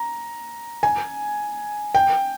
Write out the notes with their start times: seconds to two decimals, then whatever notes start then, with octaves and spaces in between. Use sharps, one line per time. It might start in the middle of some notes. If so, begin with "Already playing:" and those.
Already playing: A#5
0.83 G#5
1.95 G5